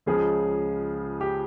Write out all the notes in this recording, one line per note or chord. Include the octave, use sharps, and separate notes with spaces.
C#2 C#3 F3 G#3 G#4
G4